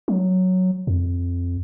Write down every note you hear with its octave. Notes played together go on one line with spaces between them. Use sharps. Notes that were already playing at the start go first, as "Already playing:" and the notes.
F#3
F2